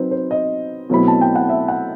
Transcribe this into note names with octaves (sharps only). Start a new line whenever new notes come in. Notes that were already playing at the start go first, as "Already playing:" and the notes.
Already playing: F#3 C4 D#4 B4 C5
C5
D#5
B2 F#3 A3 C4 E4 B5
A5
G5
F#5
E5
F#5